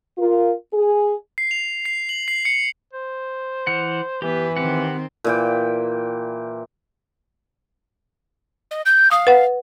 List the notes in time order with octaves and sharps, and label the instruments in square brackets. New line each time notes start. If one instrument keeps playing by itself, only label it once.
[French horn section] F4 A#4
G#4
[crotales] C7
F7
C7
F#7
C7
C#7
[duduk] C5
[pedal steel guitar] E3 F#5
[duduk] E3 [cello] B3 B4 [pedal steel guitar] G4
[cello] D#3 C4 [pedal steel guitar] G4 F#5
[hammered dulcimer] A#2 E3 G5
[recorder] D#5
G6
[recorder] F5 [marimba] D#6
[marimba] B4 F#5